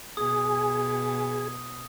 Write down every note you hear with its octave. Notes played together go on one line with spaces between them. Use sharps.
B2 G#4 D#6